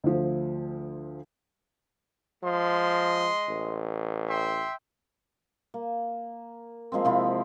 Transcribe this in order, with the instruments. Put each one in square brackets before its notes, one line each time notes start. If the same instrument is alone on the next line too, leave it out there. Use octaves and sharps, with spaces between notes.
[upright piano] D2 F3
[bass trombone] F3 [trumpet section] G#3 D#5 C6
[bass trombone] A1
[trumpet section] E5 G5 C6
[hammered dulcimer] A#3
F3 G#3 A#3 C4
C3 F3 E4